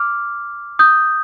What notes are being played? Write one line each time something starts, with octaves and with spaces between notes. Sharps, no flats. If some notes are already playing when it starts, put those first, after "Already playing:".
Already playing: D6 F6
D#6 G6